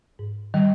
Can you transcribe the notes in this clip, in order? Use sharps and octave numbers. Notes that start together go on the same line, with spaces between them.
G#2
D#3 G3